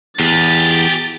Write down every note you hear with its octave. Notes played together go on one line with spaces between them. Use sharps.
E2 G4 G#4 A6